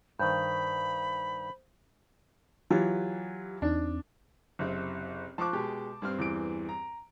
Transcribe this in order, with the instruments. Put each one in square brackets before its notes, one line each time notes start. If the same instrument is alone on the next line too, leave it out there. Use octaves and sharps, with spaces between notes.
[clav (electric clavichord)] G2 D#3 [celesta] C5 G6 [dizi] B5
[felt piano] E3 F#3 F4 [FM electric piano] G4
[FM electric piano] E2 C4 D#4 [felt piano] D4
[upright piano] F#1 [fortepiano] C3 C4
[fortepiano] F3 F#6 [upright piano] A5 C#6 D6
[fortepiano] B2 G#3 G4
G2 C4 F6
[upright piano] E2 E3 D7
A#5